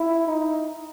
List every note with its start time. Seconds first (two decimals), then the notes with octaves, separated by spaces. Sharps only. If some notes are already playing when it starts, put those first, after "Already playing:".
Already playing: E4
0.27 D#4